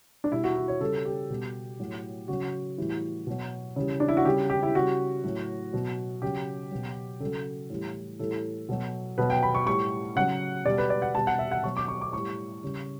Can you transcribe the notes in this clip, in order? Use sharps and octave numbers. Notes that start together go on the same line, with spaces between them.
D4
B2 G3 E4
F#4
E4
C#5
C#3 G3 A4
G4
B2 G3
A2 F#3
C#3 F#3 F#4
A2 E3 G3
B2 F#3
C#3 E3 G3
D4
E4
F#4
C#3 G3 G4
G4
E4
C#3 G3 F#4
A2 F#3
B2 F#3
C#3 F#3 G4
B2 F#3
C#3 A4
F#3
A2 E3 G3
A2 E3 G3 A4
B2 F#3
B2 F#3 B4
G5
B5
C#6
A2 G3 C#6
C#3 F#3 F#5
B2 G3 D5
B4
D5
F#5
B2 G3 A5
F#5
E5
F#5
B2 F#3 C#6
D6
C#6
D6
A2 G3 C#6
C#3 G3